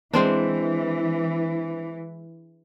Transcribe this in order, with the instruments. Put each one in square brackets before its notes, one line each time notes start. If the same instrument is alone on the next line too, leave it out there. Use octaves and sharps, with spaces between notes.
[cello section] E3 [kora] G#3 C4 D4